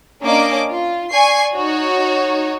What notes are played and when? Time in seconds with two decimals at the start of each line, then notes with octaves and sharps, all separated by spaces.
0.22 A#3 C#4 D4 D#5 D6
0.70 F4
1.11 D5 G#5 C#6 C7
1.55 D#4 F#4 C#5